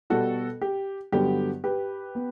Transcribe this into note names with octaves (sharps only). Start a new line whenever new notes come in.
B2 G3 B3 F#4 A4
G4
G2 D3 F#3 B3 G4
G4 B4
B3